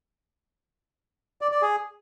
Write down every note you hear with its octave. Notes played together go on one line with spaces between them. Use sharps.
D5
D5
G#4